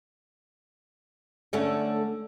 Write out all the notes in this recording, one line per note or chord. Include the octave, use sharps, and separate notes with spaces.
D3 A3 C#4